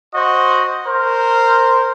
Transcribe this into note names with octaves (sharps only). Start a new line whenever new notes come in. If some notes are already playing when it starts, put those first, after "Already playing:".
F#4 C5 D#5
A#4 C5